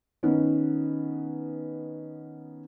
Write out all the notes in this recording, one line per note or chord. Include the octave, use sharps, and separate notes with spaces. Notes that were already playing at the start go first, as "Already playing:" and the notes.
D#3 B3 C#4